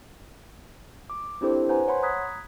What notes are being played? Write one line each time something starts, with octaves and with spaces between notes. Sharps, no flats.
D6
C4 D4 E4 G4 A4 C5
B4 C5 F#5 G#5 A#5
C#5 F#5 B5 C6
A#5 B5 D#6 F#6 G#6 B6